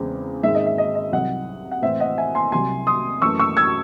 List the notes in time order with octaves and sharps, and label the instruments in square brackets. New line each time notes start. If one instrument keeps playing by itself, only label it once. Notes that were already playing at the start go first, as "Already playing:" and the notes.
Already playing: [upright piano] E2 C#3 G#3 C4
G#2 D#3 G#3 C4 E5
D#5
E5
D#5
D#5
C2 C3 F#3 D#5 F#5
F#5
A2 E3 C4 E5
D#5 F#5
E5 G#5
G#5 C6
C2 C3 F#3 G#5 C6
C6 D#6
F#2 E3 A3 C#6 E6
C#6 E6
E6 G#6